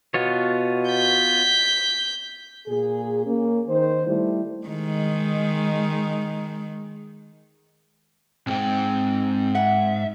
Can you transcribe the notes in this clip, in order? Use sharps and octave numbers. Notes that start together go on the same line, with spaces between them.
B2 B3 F4 C#5
G6 B6
A#2 G#4
A#3 C#4
D#3 C5
G3 A3 E4
D#3 G#3
B1 G#2 C4 G5
E5 F#5